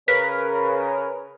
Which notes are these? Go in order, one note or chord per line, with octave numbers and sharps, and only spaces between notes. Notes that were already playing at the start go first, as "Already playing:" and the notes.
C#3 A#4 B4 B6